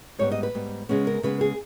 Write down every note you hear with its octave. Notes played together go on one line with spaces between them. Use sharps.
G#2 G3 B3 C#5
D#5
B4
G#2 G3 B3
C#3 G#3 B3 C#4
A#4
C#3 G#3 B3 B4
G#4